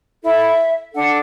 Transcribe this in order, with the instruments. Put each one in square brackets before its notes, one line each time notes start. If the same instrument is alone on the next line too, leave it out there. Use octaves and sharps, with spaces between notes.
[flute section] E4 A4 E5
D4 A4 F#5